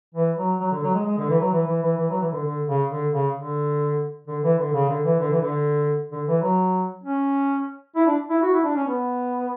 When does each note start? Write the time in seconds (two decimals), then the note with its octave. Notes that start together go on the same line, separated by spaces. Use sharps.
0.14 E3
0.36 F#3
0.60 F#3
0.71 D3
0.83 F#3
0.95 G#3
1.05 G#3
1.18 D3
1.30 E3
1.40 F#3
1.52 E3
1.67 E3
1.82 E3
1.97 E3
2.10 F#3
2.21 E3
2.32 D3
2.44 D3
2.67 C#3
2.90 D3
3.12 C#3
3.36 D3
4.28 D3
4.43 E3
4.58 D3
4.73 C#3
4.89 D3
5.05 E3
5.20 D3
5.30 E3
5.41 D3
6.12 D3
6.28 E3
6.42 F#3
7.04 C#4
7.95 E4
8.07 D4
8.30 E4
8.42 F#4
8.53 E4
8.64 D4
8.76 C#4
8.87 B3